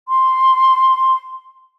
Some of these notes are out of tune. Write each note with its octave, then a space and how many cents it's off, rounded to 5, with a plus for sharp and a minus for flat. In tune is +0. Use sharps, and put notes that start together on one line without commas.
C6 +0